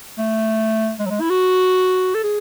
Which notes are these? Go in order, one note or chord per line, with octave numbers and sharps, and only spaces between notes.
A3
G#3
F#3
G#3
E4
F#4
A4
G#4